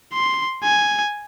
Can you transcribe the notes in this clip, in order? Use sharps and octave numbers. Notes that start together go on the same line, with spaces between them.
C6
G#5